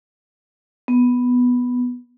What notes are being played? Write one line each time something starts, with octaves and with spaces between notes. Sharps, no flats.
B3